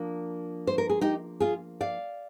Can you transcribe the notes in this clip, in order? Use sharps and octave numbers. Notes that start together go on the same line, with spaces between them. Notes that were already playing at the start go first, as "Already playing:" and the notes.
Already playing: F3 A#3 D4
C5
A#4
G#4
D#4 G4
F4 G#4
D5 F5